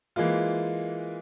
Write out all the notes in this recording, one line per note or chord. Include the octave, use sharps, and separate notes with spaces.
E3 G#3 A#3 F4